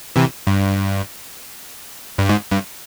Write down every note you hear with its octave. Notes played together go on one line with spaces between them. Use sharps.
C3 E3
G2
G2
G#2
G2